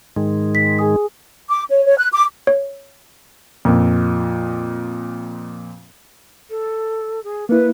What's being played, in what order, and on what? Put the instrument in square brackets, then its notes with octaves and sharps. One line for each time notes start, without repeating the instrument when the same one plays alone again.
[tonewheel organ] G#2 D#3 G#3
[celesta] B6
G#4 G#5 D#6
[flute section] D6
C#5
C#5
F#6
D6
[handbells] C#5
[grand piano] F2 A#2
[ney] A4
G#4
[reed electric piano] A#3 E4 [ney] B4